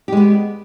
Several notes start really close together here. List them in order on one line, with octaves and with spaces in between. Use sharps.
G4 G#3 B3